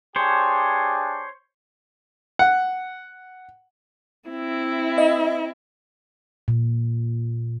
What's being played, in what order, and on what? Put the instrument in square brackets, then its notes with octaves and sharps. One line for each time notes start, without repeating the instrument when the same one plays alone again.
[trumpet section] D4 G4 G#4 [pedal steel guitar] C5 C#5
[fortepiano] F#5
[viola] C4 E4
[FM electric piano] D#5 E5
[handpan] A#2